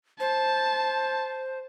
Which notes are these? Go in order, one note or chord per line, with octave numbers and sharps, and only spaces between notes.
C5 A5